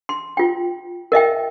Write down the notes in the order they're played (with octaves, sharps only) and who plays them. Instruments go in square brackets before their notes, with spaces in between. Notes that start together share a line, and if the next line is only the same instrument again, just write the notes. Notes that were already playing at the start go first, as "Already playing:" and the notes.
[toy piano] C6
F4 G5
A#4 D#5 E5 G5